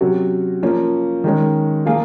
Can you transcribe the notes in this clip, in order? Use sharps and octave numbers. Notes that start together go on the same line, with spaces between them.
C3 F#3 C#4 F#4
F3 A#3 C#4
D#3 G#3 C#4
F3 A#3 F4 G#4